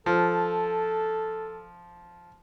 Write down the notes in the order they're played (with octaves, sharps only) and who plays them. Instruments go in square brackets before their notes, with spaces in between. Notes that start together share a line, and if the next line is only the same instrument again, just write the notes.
[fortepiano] F3 [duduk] A4